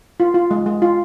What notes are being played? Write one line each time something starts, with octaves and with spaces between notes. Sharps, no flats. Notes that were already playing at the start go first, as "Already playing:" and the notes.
F4
F4
G#3
G#3
F4